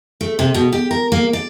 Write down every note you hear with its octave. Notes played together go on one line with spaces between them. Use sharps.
A3
C3
B2
G4
A#4
A#3
D5